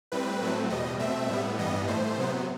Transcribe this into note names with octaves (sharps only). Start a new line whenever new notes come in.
A2 G3 C4 B4
A2 F#3 A3 C4
E2 B2 G3 D#5
B2 A3 C4 E5
A2 G3 B3
G2 E3 G3 B3 D#5
A2 E3 A3 C5
C3 F#3 B3